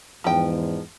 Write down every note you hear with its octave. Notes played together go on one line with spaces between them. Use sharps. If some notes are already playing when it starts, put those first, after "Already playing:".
E2 G#2 F3 G5